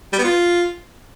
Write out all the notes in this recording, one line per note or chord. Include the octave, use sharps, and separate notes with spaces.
G3
B3
F4